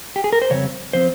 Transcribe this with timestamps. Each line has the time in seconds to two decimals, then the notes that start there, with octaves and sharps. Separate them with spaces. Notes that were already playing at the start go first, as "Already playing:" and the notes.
0.16 G4
0.24 G#4
0.33 A#4
0.42 C5
0.50 F2 C#3 G3 C4 C#5
0.93 F3 C4 C5